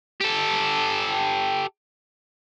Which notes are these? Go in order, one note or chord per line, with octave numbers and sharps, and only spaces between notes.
G4 A4